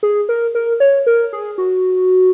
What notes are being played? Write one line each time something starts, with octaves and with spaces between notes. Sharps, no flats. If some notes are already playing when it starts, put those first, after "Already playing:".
G#4
A#4
A#4
C#5
A#4
G#4
F#4